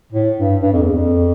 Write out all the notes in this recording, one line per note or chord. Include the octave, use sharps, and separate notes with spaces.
A2
G2
G2
F2
E2
F2